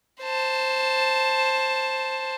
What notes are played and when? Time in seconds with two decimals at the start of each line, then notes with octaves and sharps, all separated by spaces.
0.22 C5 A5